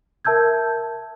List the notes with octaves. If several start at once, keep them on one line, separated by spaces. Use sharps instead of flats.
A#4 E5 A5 E6 G6 G#6